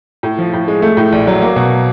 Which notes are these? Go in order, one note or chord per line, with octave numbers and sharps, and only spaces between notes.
A2
F3
A2
G#3
A3
A2
A#1
F#3
A#3
B2